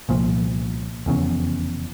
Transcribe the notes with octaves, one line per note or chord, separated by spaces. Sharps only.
C2 A#2 F3
F1 E2 C#3